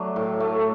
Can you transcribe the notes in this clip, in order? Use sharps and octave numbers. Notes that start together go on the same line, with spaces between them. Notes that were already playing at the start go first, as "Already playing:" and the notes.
Already playing: F#3 A3 D4 D5
A2
A3